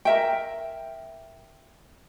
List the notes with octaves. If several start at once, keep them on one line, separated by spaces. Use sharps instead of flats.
A#4 E5 G5